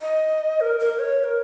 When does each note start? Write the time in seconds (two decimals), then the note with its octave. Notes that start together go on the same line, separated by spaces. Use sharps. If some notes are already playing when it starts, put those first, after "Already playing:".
0.02 D#5
0.61 A#4
0.79 A#4
0.99 C#5
1.19 C#5
1.24 A#4